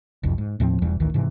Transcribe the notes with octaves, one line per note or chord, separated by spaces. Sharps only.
F1 C2 F2
G#2
D#2 A2 F3 C4
E1 E2 E3 G3
A1 D2 D#3 E3
G#2 C3 E3